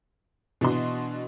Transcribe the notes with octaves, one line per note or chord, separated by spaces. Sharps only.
B2 E3 D4 F#4 D#5 C6